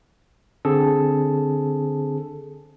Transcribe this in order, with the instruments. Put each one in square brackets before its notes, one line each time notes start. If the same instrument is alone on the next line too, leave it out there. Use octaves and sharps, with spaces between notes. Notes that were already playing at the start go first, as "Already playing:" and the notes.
[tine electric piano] D3 C4 G#4 A4